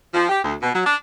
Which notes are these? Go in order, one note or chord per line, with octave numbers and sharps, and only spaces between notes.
F3
G4
D2
B2
F#3
D4